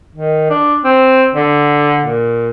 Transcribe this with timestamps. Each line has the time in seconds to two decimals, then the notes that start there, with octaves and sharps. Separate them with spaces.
0.15 D#3
0.50 D4
0.84 C4
1.34 D3
2.05 A#2